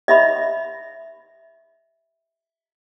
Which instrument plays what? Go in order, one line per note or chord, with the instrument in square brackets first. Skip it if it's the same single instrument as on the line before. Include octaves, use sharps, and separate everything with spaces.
[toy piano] D#5 E5 B5